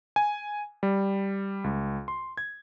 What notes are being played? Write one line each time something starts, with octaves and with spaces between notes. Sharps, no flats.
G#5
G3
C#2
C6
G#6